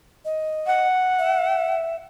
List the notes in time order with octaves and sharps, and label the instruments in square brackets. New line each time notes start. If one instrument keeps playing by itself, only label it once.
[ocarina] D#5
[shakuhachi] F#5
[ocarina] E5